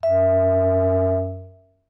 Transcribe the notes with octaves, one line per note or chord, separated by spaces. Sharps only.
F#2 E5